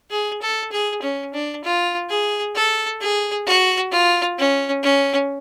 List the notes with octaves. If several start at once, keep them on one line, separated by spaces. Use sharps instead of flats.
G#4
A4
G#4
C#4
D4
F4
G#4
A4
G#4
F#4
F4
C#4
C#4